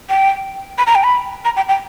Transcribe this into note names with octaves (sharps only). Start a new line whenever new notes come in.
G5
B5
A#5
G5
B5
A#5
G5
G5